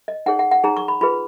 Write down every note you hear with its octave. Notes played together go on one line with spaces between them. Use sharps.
D#5
D#4 G#4 C#5 F#5
F#5
F#5
D#4 G#4 C#5 A#5
C#6
B5
F4 G#4 B4 B5